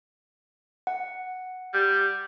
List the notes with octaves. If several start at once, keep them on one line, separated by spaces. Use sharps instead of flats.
F#5
G3